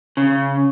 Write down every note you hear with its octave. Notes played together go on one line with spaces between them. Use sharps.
C#3